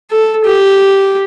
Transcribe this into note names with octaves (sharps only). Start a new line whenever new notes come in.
A4
G4